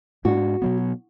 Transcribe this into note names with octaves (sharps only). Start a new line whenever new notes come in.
G#2 G#3 D4 F#4
B2 F#3 B3